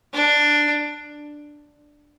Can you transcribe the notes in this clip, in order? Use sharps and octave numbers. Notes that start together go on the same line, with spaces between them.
D4